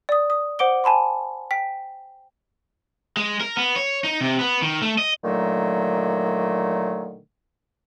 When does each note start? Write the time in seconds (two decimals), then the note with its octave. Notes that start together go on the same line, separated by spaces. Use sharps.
0.09 D5 D#6
0.30 D#6
0.59 C5 F#5 D6 D7 G7
0.84 G#5 A5 B5 C6
1.51 G5 B6
3.17 G#3
3.41 A#4
3.57 B3
3.76 C#5
4.04 D#4
4.21 C3
4.39 B3
4.62 D#3
4.82 A3
4.98 D#5
5.24 A#2 D3 D#3 F#3 A3